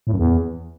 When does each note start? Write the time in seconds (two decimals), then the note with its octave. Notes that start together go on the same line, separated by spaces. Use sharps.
0.07 A2
0.12 F#2
0.17 E2